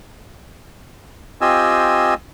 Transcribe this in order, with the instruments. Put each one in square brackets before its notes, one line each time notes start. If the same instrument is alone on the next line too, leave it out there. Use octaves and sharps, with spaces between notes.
[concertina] C4 F4 G4 D#5 G#5 E6